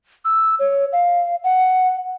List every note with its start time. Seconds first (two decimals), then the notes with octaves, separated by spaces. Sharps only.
0.25 E6
0.59 C#5
0.93 F5
1.44 F#5